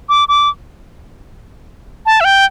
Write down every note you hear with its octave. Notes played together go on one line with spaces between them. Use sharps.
D6
D6
A5
E5
G5